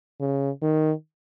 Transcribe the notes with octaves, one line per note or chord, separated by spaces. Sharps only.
C#3
D#3